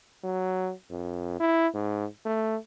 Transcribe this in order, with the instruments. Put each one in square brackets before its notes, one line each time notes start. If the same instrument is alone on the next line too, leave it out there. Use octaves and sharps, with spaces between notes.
[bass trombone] F#3
F2
E4
G#2
A3